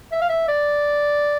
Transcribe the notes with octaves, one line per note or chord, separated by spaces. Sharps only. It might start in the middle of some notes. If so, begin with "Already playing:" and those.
E5
F5
E5
D5